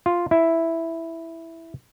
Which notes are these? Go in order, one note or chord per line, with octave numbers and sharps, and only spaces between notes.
F4
E4